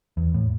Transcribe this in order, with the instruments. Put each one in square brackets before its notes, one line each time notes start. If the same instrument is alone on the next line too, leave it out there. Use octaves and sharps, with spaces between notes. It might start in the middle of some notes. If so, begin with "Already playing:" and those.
[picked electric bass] E2
A2